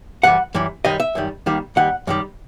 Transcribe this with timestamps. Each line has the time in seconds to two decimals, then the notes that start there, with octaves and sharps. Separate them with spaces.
0.23 F#2 E3 G3 F#5
0.55 F#2 E3 G3
0.85 F#2 D#3 G3 D#5
1.00 E5
1.15 F#2 D#3 G3
1.46 D#2 D#3 G3
1.76 D#2 D#3 G3 F#5
2.07 F#2 D#3 G3